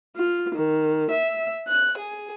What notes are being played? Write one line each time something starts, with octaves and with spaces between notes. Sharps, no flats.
F4
D#3
E5
F#6
G#4